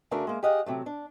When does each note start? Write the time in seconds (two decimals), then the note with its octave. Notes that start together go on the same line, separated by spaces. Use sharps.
0.11 C#3 A3 D4 F#4 A#4
0.27 G#3 A#3
0.43 G4 G#4 D#5 F5 F#5
0.66 C3 F#3 A3
0.86 D4